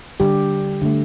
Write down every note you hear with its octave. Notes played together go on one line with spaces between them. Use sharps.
D3 G3 G4
D3 A3